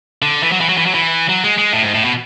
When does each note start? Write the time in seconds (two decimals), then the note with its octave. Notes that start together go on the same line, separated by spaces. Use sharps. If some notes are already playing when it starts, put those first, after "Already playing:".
0.22 D3
0.43 E3
0.52 F#3
0.60 E3
0.69 F#3
0.77 E3
0.86 F#3
0.94 E3
1.29 F#3
1.44 G#3
1.58 G#3
1.72 A2
1.83 G#2
1.94 A2
2.05 B2